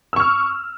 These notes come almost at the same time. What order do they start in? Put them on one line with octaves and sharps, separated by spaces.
E6 C#6 F6